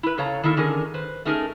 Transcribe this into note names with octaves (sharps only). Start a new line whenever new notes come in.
E4 B4
C#3 A4 C#5 F5 A#5
D#3 A#3 E4 A4
D3 D#3 C#4 G#4 A#4
B4 C5
A3 C#4 D#4 G#4 A#4